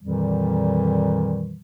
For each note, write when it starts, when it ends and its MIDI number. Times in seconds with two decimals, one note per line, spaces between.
0.01 1.60 41
0.01 1.60 46
0.01 1.60 51
0.01 1.60 52
0.01 1.60 55